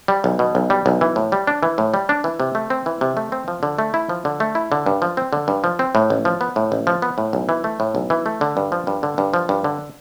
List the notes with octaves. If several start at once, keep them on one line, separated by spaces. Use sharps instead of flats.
G3
B1
B2
B1
G3
B1
E3
A2
G3
D4
E3
A2
G3
D4
E3
C3
A3
C4
E3
C3
A3
C4
F3
D3
A3
E4
F3
D3
A3
E4
D3
G2
F3
C4
D3
G2
F3
C4
A2
A1
F3
B3
A2
A1
F3
B3
A2
B1
E3
A3
A2
B1
E3
A3
D3
G2
F3
G2
D3
G2
F3
G2
D3